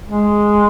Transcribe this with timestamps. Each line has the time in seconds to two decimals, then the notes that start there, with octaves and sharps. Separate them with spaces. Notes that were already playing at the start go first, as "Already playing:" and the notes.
0.06 G#3